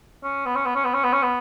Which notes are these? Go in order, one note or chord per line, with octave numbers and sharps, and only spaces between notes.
C#4
B3
C#4
B3
C#4
B3
C#4
B3
C#4
B3